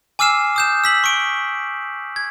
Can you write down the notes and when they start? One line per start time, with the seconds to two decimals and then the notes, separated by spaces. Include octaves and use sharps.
0.19 G#5 D6 E6 F6 C7 E7
0.56 D#6 G6 E7
0.84 E6 B6 F#7
1.04 C#6 D7
2.16 G#6